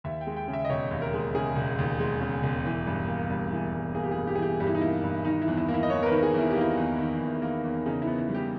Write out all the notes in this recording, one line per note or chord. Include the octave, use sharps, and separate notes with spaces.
D#2 E5
G5
G#3
G5
C#3
E5
D#5
E1 C#5
D#2
A#4
G#3
C#3 G#4
E1
D#2
G#3
C#3
E1
E3
G2
A#3
G2
E3
G2
A#3 G#4
G4
G#4
G2
G4
G#4
E3 G4
G2 G4
E4
D#4
A#3 E4
G2
D#3 D#4
E4
E2
E4
A#3
E4
D#5
E2 C#5
A#4
B4
D#3
G#4
E2 E4
A#3 G4
E4
E2
D#3
E2
A#3
E2
C#3 D#4
E4
B3
E4
G3
G4